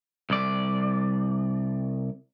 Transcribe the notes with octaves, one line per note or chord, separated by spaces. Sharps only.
C2 D5